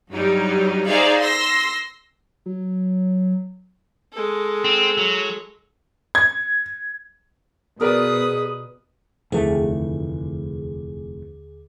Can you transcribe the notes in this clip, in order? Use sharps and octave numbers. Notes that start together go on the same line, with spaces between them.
G2 F#3 G3 D#4
D#4 G#4 C5 D5 E5 F5
C6 E6 A#6
F#3
G#3 A4
C4
F#3
G#6
B2 G#4 A#4 B4 D5 D#6
F1 D#2 D3 E3 A3 G#4